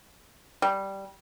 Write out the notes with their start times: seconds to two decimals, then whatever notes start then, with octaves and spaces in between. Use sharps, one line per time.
0.62 G3